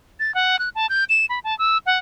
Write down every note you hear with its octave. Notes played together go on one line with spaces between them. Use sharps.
A6
F#5
F#6
A5
G6
E7
B5
A5
E6
F#5